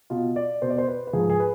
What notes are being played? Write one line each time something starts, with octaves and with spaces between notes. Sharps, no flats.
B2 F4
D5
B2 C5
D5
C5
B4
B4
G#2 F3 G#4
G#4
B4